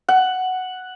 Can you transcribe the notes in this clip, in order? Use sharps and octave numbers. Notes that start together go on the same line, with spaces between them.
F#5